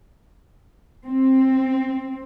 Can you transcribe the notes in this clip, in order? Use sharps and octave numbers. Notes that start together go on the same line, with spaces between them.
C4